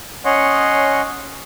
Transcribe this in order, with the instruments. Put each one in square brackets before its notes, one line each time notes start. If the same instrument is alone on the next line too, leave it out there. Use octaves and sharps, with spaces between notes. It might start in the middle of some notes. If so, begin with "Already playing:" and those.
[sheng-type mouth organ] C#4 C#5 D#5 F#5 C6